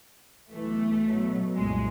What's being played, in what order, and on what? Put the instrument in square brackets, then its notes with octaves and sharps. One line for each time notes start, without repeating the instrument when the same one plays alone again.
[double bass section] B1 E3 [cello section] A3
[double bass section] B2 F#3
[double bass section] C2 F#2 A#2 [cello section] G#3